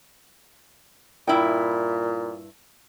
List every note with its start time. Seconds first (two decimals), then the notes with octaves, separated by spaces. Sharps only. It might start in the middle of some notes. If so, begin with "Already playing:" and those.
1.27 G2 A#2 E4 G5